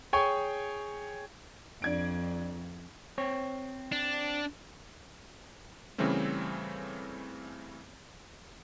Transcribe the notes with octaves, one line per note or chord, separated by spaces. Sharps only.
G#4 C#5 G5 G#5 C#6
F2 D4 G#6 D7
C4 C#5
D4
C#3 E3 G3 A3 C4 C#4